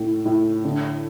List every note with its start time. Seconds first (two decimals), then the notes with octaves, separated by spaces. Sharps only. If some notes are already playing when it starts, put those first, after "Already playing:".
Already playing: A2
0.25 A2
0.65 D3